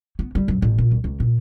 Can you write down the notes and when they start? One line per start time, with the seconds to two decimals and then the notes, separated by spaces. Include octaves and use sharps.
0.19 B3
0.35 G3
0.48 F#2
0.62 A1
0.78 A#2
0.91 C2
1.04 C#2
1.20 A#2